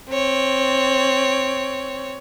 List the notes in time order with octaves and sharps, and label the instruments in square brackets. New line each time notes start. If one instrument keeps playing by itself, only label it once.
[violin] C4 C#5